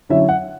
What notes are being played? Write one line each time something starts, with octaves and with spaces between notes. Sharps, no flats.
D3 F#3 C#4 E4 E5
F#5